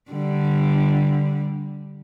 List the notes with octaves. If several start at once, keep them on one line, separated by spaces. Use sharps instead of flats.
D3 G3